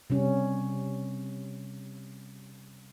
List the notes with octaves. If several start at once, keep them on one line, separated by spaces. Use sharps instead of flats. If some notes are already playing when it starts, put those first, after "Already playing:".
C3 G3 C#4